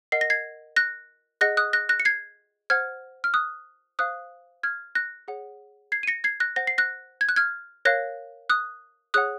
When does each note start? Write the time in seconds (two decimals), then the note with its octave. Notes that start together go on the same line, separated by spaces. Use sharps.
0.12 A#4 D#5 F#5 C7
0.21 A#6
0.30 G#6 C7
0.76 F#6 A#6
1.41 G#4 D#5 F#5 F#6 A#6
1.57 D#6 F#6
1.73 F#6 A#6
1.89 F#6 A#6
2.00 C#7
2.05 G#6 C7
2.70 C5 F#5 F6 G#6
3.24 F6
3.34 D#6 F#6
3.99 C5 F5 D#6 F#6
4.63 F6 G#6
4.95 F#6 A#6
5.28 G#4 C#5 F#5
5.92 G#6 C7
6.03 D#7
6.07 A#6 C#7
6.24 G#6 C7
6.40 F#6 A#6
6.56 C5 F#5 A#6
6.67 C7
6.78 F#6 A#6
7.21 G#6
7.29 F#6
7.36 F6 G#6
7.85 A#4 C#5 F5 F#6 A#6
8.50 D#6 F#6
9.14 G#4 C#5 F#5 D#6 F#6